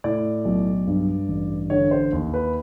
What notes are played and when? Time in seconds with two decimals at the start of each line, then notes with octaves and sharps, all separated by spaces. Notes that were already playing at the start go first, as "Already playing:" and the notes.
0.04 A2 D5
0.45 B1
0.87 G2
1.28 A1
1.70 D3 C#5
1.91 C5
2.12 D#2
2.34 B4